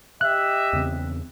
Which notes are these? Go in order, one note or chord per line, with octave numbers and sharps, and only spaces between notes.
G4 D#5 E5 F#6
E2 C#3 C4